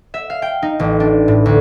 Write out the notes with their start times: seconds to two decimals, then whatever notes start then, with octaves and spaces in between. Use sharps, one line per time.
0.14 E5
0.30 F5
0.42 G5
0.62 D#4
0.79 A1
1.00 D4
1.28 A2
1.46 D2